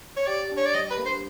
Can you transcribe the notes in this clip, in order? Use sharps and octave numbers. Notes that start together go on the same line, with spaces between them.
C#5
G4 D5
D4
C#5
D5
G3 D#5
B4
A#3
C5